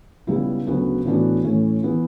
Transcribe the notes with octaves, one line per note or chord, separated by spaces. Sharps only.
C#2 C#3 G3 B3 E4
D2 C#3 F#3 B3 F#4
A2 E3 B3 D4 F#4
A2 E3 A3 C#4
E3 B3 E4